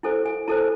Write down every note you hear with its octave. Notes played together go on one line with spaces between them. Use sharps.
E4 A4 C5 G#5
G#5
E4 A4 C5 A5